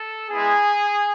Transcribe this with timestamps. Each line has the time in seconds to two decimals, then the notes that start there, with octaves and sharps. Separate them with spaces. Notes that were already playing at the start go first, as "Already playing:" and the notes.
Already playing: A4
0.30 G#3 B3 E4 G#4